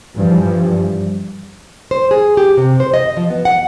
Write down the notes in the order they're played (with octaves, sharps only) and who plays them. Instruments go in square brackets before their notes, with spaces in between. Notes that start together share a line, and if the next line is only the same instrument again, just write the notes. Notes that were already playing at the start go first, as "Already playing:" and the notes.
[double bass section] G2 E3 F3 G3
[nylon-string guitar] C5
G#4
G4
C3
C5
D#5
F3
B3
F#5